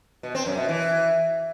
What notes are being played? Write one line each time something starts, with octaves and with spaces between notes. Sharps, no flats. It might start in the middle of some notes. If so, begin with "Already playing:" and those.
B2
C4
F#2
B2
E3